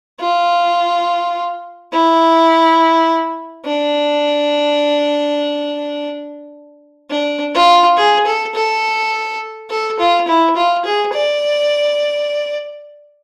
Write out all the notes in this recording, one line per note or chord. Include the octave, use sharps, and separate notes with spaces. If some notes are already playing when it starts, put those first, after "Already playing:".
F4
E4
D4
D4
F4
G#4
A4
A4
A4
F4
E4
F4
G#4
D5